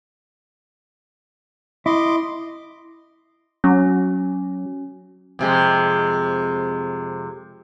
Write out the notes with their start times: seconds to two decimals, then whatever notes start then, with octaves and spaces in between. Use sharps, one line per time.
1.86 E4 D#5 C6 D6
3.64 F#3 C#4
5.39 F2 C3 G#3